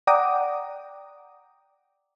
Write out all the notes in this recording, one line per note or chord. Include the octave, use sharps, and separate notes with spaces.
D5 F#5 G5 A#5 D6 D#6